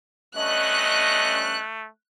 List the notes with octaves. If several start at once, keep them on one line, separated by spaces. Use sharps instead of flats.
G2 A3 C#4 D#5 F#6